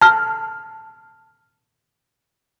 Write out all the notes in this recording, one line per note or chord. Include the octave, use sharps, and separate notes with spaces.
A5 F6